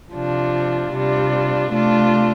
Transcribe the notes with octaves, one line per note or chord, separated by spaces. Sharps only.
C3 F3 D4 F4
C3 G3 D4 F4
C3 A3 D4 F4